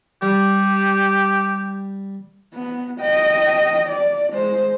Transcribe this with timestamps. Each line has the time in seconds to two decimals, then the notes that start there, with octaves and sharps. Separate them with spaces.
0.22 G3 G4
2.54 B3
3.01 D#5 G5
3.89 D5
4.33 G#3 C5